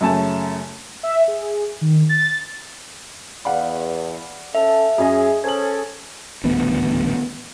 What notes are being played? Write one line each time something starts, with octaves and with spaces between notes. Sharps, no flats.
F#2 C#3 A3 G#5 A5
E5
G#4
D#3
A6
E2 D5 F5 F#5 B5
C#4 A4 E5
F#2 C#4 G#4 D#5
C#4 G#4 A4 C5 G#6 F#7
D#1 A1 D2 B3